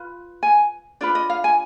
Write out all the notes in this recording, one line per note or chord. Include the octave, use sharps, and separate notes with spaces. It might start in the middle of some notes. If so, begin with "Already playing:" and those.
Already playing: F4 B4
G#5
D4 F4 B4 D5
D#5
F5
G#5